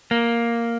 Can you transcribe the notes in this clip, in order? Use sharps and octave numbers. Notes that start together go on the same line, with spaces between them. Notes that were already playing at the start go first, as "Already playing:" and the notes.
A#3